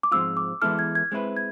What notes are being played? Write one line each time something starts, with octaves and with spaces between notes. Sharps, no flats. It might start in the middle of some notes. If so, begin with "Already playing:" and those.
D6
G#2 F3 G#3 C4 F4 E6
D6
E3 G#3 B3 E4 A4 F6
G#6
G#6
G#3 C4 E4 B4
G#6